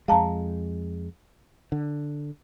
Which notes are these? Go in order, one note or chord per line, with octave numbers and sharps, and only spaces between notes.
F2 G#3 F5 A5 A#5
D3